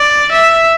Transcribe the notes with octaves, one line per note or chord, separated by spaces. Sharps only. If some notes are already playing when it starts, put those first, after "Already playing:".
Already playing: D5
E5